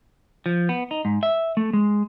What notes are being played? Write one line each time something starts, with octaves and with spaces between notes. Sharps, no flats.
F3
B3
D#4
G#2
E5
A3
G#3